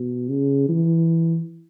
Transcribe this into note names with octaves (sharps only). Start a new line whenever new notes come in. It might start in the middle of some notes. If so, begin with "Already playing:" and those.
Already playing: B2
C#3
E3